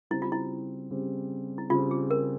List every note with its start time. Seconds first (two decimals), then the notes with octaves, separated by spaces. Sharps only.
0.10 C#3 G3 C4 E4
0.22 F4
0.32 E4
0.90 C#3 G3 C4
1.58 E4
1.70 C#3 G3 C4 F4
1.91 G#4
2.11 A#4